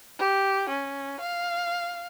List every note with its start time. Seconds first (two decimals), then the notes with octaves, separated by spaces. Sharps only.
0.19 G4
0.70 C#4
1.20 F5